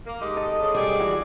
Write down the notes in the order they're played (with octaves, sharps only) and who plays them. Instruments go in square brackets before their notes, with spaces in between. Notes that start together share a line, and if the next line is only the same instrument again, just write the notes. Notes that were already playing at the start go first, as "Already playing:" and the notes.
[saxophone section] A#3
G#3 D#4 G4
[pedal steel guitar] A4 D#5
[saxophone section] C#3
[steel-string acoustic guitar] G3 G#4 [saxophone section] D5
[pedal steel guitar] E3 E4 F#4